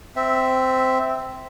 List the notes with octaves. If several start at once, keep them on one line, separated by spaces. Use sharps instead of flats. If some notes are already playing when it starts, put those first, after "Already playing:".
C4 E5